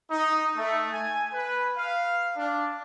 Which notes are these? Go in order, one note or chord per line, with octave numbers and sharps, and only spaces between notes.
D#4
A3
G#5
B4
F5
D4